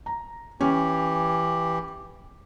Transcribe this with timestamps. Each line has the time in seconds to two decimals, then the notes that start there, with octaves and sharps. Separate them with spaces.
0.06 A#5
0.61 E3 C#4 G4